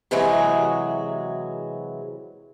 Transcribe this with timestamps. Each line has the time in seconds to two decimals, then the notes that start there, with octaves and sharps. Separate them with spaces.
0.11 C3 E3 F#3 G#3 F#4 G#4